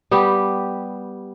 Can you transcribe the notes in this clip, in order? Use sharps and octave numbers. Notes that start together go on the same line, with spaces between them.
G3 B3 G4